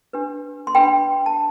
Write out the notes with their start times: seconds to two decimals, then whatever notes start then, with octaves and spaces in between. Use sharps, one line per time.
0.13 D4 G4 B4
0.67 C6
0.75 D4 G4 B4 G5 B5
1.26 A5